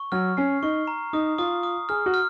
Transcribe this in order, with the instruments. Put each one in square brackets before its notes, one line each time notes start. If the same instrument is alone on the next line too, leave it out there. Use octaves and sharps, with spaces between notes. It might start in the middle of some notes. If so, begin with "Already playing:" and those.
Already playing: [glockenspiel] C#6
[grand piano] F#3 [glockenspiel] F6
[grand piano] C#4 [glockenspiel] C7
[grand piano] D#4 [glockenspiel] C#6
[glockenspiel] A#5
[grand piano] D#4 [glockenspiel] D#6
[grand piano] F4 [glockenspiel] D#6
[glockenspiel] D#6
[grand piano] G#4 [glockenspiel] F6
[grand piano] F#4
[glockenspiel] F6